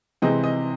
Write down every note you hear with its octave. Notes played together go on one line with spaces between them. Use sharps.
C3 E3 G#3 C4 D#5
D#5